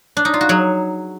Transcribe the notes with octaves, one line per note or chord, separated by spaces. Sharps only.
D4
D#4
F4
F#4
F#3 G#4